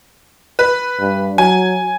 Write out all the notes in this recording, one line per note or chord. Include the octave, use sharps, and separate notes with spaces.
B4
G2
F#3 G#5